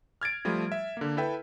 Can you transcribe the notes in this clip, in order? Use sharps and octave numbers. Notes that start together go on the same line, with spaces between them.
F6 G#6 A6 D7
F3 G3 A3
E5
D3 A#3
E4 A4 B4 E5 G5